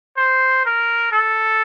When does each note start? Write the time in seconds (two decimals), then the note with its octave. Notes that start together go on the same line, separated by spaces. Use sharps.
0.17 C5
0.65 A#4
1.12 A4